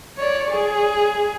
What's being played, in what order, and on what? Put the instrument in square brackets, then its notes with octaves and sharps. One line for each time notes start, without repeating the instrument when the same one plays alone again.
[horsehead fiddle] C#5 D5
G#4